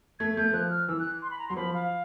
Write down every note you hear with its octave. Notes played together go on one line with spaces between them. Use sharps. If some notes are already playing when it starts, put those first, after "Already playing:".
A3 G#6
A3 G6
F3 F#6
F6
E3 E6
F#6
C6
B5
A#5
F#3 C6
F3 B5
F5